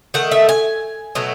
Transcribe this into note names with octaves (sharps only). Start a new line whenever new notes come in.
D#3 A3 F#5
E5
G#5
B2 F#3 A3